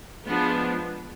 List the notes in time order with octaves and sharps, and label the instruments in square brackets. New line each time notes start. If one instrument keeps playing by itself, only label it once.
[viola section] F3 G#3 B3 D4